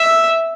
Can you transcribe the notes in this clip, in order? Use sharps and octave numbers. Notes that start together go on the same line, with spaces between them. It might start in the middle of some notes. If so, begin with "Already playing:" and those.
Already playing: E5